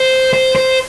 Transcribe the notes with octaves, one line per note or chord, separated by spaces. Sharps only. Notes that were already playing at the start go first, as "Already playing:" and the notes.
Already playing: C5
C5
C5